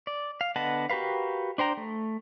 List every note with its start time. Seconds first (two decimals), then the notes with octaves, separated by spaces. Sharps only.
0.07 D5
0.41 F5
0.56 D3 B3 D#5 F#5 A5
0.90 F#4 G4 A#4 B4 F5
1.58 D4 C5 G5 A#5
1.77 A3